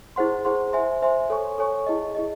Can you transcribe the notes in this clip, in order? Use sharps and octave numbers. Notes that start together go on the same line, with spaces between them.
E4 G#4 C5 F#5 C6
E4 G#4 C5 F#5 C6
C5 E5 G#5 C6
C5 E5 G#5 C6
A4 C#5 G#5 C#6
A4 C#5 G#5 C#6
E4 G#4 D#5
E4 G#4 D#5